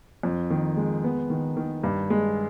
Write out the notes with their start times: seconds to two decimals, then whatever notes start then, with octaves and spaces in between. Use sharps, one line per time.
0.23 F2
0.50 D#3
0.77 G#3
1.04 B3
1.30 D#3
1.57 D#3
1.83 G2
2.10 G#3